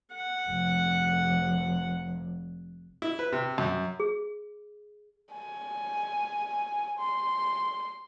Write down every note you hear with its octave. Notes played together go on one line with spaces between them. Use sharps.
F#5
F1
E4
B4
C3
F#2
G#4
G#5
C6